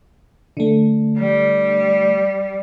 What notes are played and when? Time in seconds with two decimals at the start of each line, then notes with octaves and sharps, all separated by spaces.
0.57 D3 A3
1.17 G3